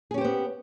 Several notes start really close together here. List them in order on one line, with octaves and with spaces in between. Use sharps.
G#4 C#4 G4 C5 B3